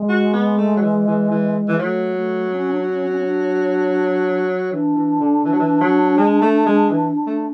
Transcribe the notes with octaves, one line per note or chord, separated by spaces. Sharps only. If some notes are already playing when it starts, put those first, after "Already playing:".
Already playing: G#3
F#4
B3
A3
F#3
E3
E3
E3
E3
F#3 A3
A3
C#4
D4
D4
C#4
C#4
C#4
D4
E3 D4
E3
D3
E3
F#3
E3
F#3
G#3
A3
G#3
E3
A3